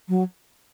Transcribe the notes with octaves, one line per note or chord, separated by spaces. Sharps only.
F#3